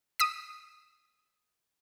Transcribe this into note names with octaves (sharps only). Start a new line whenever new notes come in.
D#6 E6 B6